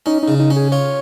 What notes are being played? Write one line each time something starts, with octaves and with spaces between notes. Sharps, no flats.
C#4 D#4
C#3 D#4
D#4
C#4
G#4
F4 C#5